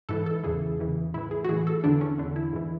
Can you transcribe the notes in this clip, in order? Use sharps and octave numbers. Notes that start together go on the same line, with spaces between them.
G#2 E3 A4
A4
E2 C#3 E3 G#4
E2 C#3 E3
A2 E3 E4
G#4
F#4
A2 E3 G#4
A4
E2 D3 D4
C#4
E2 D3
E4
G#2 E3